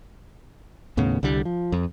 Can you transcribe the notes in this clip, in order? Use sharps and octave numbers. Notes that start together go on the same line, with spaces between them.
D#2 A2 C#3 B3
C2 D3 G3
F3
F2